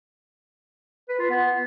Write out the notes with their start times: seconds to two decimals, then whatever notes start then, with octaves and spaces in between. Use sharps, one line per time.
1.09 B4
1.19 F4
1.30 B3